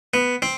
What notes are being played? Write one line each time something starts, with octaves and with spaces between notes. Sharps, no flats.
B3
C4